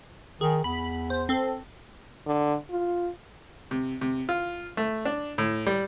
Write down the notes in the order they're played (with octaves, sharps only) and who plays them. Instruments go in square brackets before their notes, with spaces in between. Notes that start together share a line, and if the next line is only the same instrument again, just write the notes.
[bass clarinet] D#3 [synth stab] G#4
[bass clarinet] E2 [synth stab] B5
[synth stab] C5
C4 A4
[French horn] D3
F4
[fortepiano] C3
C3
F4
A3
D4
A2
G3